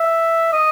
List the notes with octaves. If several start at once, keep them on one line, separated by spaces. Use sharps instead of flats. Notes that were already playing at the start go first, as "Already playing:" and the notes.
Already playing: E5
D#5